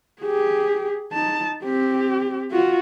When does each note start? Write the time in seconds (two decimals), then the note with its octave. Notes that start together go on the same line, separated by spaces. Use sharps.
0.22 G4 G#4
1.12 D#4 A5
1.64 C4 G4
2.51 F4 F#4